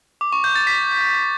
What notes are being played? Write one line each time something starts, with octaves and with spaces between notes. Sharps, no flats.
D6
C#6
G6
A6
B6